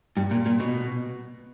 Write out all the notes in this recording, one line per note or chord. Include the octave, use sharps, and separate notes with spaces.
G2
A#2
A#2
B2